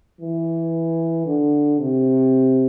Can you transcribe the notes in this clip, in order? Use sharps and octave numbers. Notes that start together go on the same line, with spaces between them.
E3
D3
C3